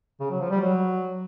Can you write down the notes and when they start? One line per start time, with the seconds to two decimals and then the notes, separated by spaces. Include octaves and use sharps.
0.20 C#3
0.30 F#3
0.40 F3
0.51 G3
0.61 F#3